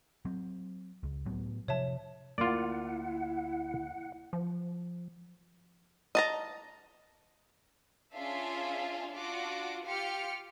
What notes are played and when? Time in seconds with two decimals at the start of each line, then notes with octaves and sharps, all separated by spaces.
0.25 F#3 C4
1.03 C#2
1.26 A2 F#3 B3
1.68 C3 F3 C#5 E5 A5
2.38 D2 A#3 E4 F4 D5 F#5
4.33 F3
6.15 D#5 A5 A#5
8.14 C#4 D4 F4 G#4 E5 F5
9.11 D4 F4 F#4 D6
9.85 F4 G4 F5 F6 C#7